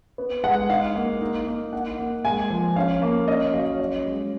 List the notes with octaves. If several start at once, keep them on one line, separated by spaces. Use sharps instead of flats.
B3
G#3 F#5
D#4 F5
A#3
D#4
A#3
D#4 F#5
A#3
G#3 G#5
F3
C#4 F5
A#3
C#4 D#5
F#3 F5
C#5
C#4 D#5
G#3